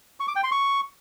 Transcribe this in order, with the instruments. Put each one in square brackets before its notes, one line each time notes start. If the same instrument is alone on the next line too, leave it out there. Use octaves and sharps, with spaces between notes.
[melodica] C#6
D6
G5
C6
C#6